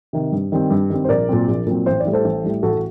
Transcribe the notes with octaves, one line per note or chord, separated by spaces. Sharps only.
C3 D#3
G2
D#3 G3 C4
G2
D#3 G3 C4
C5
A#1 A#4 D5
A#2 F#3 C4
A#1
A#2 F#3 C4
A1 C5
D5
A2 G3
A4 C5
A1
A2 G3
A1 F#4 A4
F#4